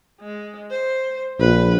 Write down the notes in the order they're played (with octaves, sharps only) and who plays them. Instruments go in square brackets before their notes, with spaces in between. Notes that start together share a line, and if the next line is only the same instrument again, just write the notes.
[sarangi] G#3
C5
[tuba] A#1 [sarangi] B4